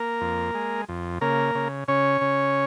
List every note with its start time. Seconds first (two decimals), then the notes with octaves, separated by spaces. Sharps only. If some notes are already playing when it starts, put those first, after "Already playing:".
Already playing: A#3 A#4
0.21 F2
0.54 G#3
0.89 F2
1.21 C#3 A#3 A#4
1.55 C#3
1.88 C#3 C#4 C#5
2.21 C#3